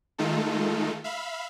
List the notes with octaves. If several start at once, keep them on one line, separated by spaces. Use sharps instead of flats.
D#3 G#3 A3 D#4 F4 A4
E5 F5 B5